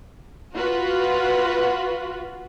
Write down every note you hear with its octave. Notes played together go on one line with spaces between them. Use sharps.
F4 F#4 B4